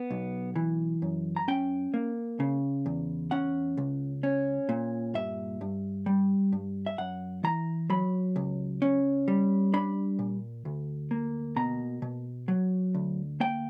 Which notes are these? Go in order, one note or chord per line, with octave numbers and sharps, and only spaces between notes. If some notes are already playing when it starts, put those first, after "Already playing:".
Already playing: B3
B1
E3
F#2
A#5
C#4 G5
A#3
C#3
E2
C#4 F#5
C#2
C#4
A#2
G2 E5
G2
G3
G2
E5
F#2 F#5
E3 A#5
F#3 B5
C#2
C#4
G3
D4 B5
A#2
D2
A#3
B2 A#5
B2
F#3
D2
A#3 G5